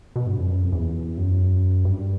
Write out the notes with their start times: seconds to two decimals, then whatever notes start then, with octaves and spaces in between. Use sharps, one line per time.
0.16 B2
0.27 G2
0.38 F2
0.49 F#2
0.61 F2
0.73 E2
1.17 F#2
1.85 G2